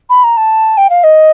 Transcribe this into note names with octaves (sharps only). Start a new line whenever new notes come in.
B5
A#5
A5
G5
F5
D#5